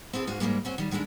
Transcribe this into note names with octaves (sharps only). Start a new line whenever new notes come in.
C4 E4 G#4 A4
G#2 G#3 F#4 F5
G#2 C#3 G3 G#3 A#3
C4 C#4 F#4
D#3 G3
D#3 G#3 A3 D4 E4